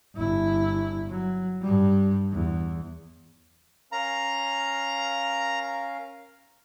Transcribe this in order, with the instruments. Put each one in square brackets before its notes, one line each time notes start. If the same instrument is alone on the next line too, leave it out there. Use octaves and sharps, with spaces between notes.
[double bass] G1 E4
F#3
G2 G3
E2
[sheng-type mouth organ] C#4 A#4 F5 [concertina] A#5